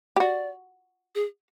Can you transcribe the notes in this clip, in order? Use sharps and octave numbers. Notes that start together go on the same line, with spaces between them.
G4
F#4 D5
G#4